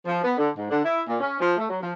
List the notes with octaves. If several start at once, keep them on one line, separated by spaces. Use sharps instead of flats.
F3
B3
D3
G#2
D3
E4
A#2
C#4
F3
A3
F#3
F3